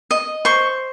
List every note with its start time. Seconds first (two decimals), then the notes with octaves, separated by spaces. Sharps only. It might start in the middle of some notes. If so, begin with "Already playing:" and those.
0.11 D#5
0.45 C5 C#6